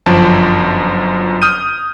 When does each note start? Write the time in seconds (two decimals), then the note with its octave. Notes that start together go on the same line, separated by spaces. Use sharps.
0.06 G1 F#2 F3 A5
1.42 D#6 F6 G6 D#7